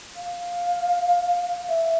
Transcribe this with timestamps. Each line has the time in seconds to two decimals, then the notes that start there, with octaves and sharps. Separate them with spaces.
0.16 F5
1.69 E5